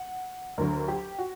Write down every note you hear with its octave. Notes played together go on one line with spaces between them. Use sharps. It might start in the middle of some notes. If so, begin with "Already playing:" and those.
Already playing: F#5
D2 D3 F#3 A#4
G4
F#4